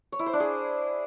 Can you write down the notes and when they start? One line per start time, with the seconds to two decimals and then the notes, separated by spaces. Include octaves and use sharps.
0.12 C#5
0.19 E4
0.26 C5
0.33 D4
0.40 G#4